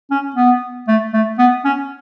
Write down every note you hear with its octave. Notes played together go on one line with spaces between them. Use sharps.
C#4
B3
A3
A3
B3
C#4